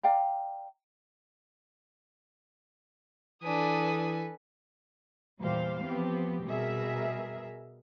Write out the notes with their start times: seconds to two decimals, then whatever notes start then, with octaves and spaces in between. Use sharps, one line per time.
0.03 D5 F5 G5 A#5
3.43 E3 D4 A4 B4 G#5 D#6
5.41 E2 A#2 G3 G4 C5 F5
5.85 F3 B3 C4 G4
6.46 B2 G3 G#4 A#4 E5